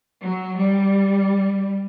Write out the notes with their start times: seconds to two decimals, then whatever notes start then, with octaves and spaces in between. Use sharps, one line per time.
0.21 F#3
0.57 G3